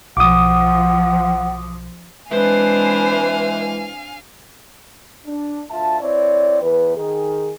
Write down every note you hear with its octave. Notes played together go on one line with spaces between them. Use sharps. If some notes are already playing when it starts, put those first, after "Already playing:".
B1 F3 F#5 D6 D#6
E3 G#3 C4 D4 B4 C5 F5 G#5
D4
D2 F4 E5 A5
C4 E4 C#5 D5
E2 B4
D#3 G#4